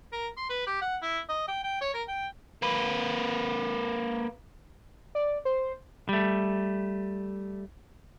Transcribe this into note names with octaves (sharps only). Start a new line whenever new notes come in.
A#4
C6
B4
G4
F#5
E4
D#5
G5
G5
C#5
A#4
G5
A#3 B4
D5
C5
G3 A3